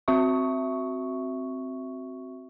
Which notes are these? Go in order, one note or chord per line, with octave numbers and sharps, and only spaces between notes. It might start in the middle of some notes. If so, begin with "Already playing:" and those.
C4 F#4 E5 C#6